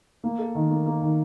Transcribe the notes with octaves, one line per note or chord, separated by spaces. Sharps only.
A#3
A4
D#3
A#3
A#3
D#3